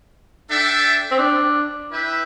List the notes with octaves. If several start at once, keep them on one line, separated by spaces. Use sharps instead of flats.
D4 A4 E5 G5
C4
D4
E4 B4 E5 G5